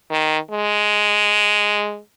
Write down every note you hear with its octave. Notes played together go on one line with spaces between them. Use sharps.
D#3
G#3